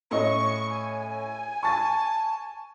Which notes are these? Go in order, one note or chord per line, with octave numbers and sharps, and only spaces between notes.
A2 C#4 D#5 C#6
G#5
A5 C#6 A6